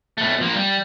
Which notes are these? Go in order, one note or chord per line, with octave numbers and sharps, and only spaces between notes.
B2 A3
F3 A#3
G3